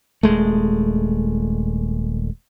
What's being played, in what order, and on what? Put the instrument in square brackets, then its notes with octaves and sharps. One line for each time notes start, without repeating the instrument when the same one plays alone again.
[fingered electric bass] D#1 C2 G#3 A3